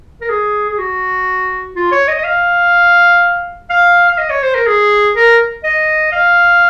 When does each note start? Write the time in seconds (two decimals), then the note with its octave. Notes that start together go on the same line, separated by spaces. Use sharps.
0.21 A#4
0.29 G#4
0.70 G#4
0.79 F#4
1.76 F4
1.92 C#5
2.08 D#5
2.18 D#5
2.24 F5
3.70 F5
4.09 F5
4.18 D#5
4.30 C#5
4.43 C5
4.55 A#4
4.67 G#4
5.16 A#4
5.64 D#5
6.12 F5